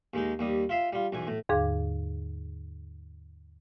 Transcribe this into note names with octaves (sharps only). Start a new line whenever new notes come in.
D#2 G#3 D#4
D#2 G3 D#6
F4 E5 F5
G3 F4
B1 E2 G#5
A2
D#2 G#2 D3 G#4 F5 D6